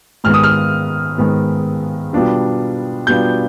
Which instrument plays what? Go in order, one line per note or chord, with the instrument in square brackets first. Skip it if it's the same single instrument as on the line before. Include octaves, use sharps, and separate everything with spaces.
[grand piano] G#2 D#3 G#3 B3 F6
D#6
F6
G#2 D#3 G#3 B3
B2 G3 B3 D4 F4
B2 G3 B3 D4 F4 G6